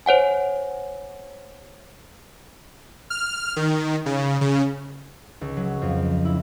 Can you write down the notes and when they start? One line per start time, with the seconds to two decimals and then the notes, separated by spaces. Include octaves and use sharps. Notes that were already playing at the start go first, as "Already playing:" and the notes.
0.06 C5 C#5 F#5 G#5
3.10 F6
3.56 D#3
4.06 C#3
4.41 C#3
5.41 C#2
5.57 F#3
5.82 F2
6.25 E4